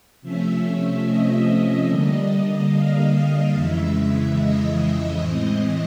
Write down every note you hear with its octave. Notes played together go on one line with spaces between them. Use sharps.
C3 F3 A3 C#4 E5
D#5
D3 G3 A#3 D4
F5
F2 C#3 E3 G#3 E5
D#5
A2 E3 G#3 C4